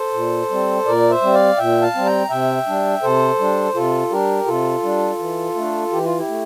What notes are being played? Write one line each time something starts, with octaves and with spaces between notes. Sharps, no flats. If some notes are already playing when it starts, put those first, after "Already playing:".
Already playing: A4 C5
A#2
G3 C4
A#2 A#4 D5
C5 E5
G3 C4
D5 F5
A#2 E5 G5
F5 A5
G3 C4
G5 A#5
C3 E5 G5
G3 D4
C3 A4 C5
G3 D4
C3 F4 A4
G3 D4 G4 A#4
C3 F4 A4
G3 D4
E3
A3 D4
E3 G4
F4
E4 G4
A3